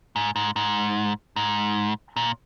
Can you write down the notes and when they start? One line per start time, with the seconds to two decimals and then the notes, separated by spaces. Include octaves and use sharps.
0.16 G#2
0.36 G#2
0.56 G#2
1.36 G#2
2.16 A#2